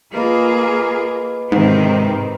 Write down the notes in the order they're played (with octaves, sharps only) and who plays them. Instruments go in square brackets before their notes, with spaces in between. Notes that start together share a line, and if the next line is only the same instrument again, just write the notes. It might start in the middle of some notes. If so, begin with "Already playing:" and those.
[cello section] A#3 F4 G#4 [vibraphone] B4 D#5 B5
[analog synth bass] G#2 [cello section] C3 D#3 C4